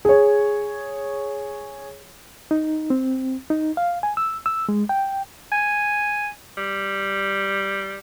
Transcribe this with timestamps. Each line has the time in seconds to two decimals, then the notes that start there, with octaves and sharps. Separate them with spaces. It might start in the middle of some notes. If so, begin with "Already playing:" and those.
0.05 G#4 C#5
2.51 D#4
2.90 C4
3.50 D#4
3.77 F5
4.03 G#5
4.17 E6
4.46 E6
4.69 G#3
4.89 G5
5.52 G#5
6.57 G3